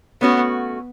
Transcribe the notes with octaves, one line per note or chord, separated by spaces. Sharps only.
A3 B3 C#4 F#4